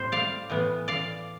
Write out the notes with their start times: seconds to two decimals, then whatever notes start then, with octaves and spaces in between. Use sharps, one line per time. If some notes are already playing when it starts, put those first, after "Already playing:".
Already playing: A2 G3 C4 C5
0.12 D5 F5
0.50 A2 E3 B3
0.88 D5 F5